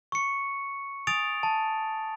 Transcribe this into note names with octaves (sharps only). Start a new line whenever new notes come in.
C#6 C#7
G#5 D#6 A6 D7 F7
A5